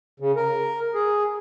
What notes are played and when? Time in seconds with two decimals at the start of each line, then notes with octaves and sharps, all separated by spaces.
0.20 C#3
0.36 A#4
0.94 G#4